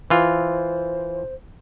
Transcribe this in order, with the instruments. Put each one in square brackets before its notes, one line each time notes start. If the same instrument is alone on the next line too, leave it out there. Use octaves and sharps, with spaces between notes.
[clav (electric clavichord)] E3 F4 [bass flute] C5